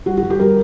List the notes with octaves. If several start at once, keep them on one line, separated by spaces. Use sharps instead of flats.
G3 F#4
F#4
G3
G4
G3 A#4